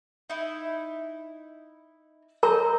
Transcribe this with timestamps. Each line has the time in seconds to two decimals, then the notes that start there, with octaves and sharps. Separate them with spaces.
0.30 D#4 E4
2.43 A#4 D#5 A#5 G6